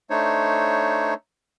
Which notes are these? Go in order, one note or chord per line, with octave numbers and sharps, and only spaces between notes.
A3 D4 D#4 C5 C#5